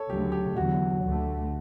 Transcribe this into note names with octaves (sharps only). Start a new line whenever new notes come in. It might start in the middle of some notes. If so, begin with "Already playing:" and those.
Already playing: A4 C#5
D2 C#3 F#3 A3 G4
G4
E2 D3 F#3 F#4
D2 D3 A3